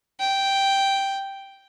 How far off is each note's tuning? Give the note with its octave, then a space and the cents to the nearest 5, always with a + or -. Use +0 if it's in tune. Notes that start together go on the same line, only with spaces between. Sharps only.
G5 +0